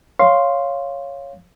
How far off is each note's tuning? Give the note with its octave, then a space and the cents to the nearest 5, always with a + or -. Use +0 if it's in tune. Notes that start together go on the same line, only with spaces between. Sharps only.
C#5 +0 F5 +0 C6 +0